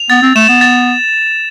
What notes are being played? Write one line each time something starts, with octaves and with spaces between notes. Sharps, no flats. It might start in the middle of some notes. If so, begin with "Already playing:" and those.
Already playing: F7
B3 A6
C4
A3 E7
B3
A6